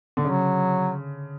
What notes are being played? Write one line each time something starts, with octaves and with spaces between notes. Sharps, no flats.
D3
C#3 F#3